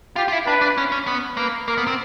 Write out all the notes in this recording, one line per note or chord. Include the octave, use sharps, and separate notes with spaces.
F4 G4
F4
E4
D4 B4
D4
C#4
C#4
B3
A#3 B4
A#3 A#4
B3
C4